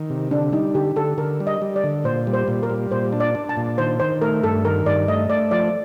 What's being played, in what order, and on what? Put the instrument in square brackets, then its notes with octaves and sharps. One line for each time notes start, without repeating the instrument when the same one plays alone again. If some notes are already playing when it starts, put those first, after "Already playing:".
Already playing: [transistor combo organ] D#3
C3
[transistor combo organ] D3 [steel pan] D4
[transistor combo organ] G3 [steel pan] D#4
[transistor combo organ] D3 [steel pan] G4
[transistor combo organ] D3 [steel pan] A4
[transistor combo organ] D3 [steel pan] A#4
[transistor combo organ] G3
[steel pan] D#5
[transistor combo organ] G3
[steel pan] D5
[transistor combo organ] D3
[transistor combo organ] A#2 [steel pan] C5
[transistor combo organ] G3
[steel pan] C5
[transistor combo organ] A#2
[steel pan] A#4
[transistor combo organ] G3
[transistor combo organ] A#2 [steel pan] C5
[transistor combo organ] D4
[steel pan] D5
[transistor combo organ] D4
[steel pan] A5
[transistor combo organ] A#2
[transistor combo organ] D#3 [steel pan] C5
[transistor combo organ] D#3 [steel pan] C5
[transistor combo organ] A3 [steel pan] A#4
[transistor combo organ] G2 [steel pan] A4
[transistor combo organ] D#3 [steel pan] A#4
[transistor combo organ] G2 [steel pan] D5
[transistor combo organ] A3 [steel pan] D#5
[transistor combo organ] A3 [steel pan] D5
[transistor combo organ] F3 [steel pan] D5